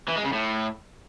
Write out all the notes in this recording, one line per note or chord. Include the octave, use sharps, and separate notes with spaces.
E3
G#3
C#3
A2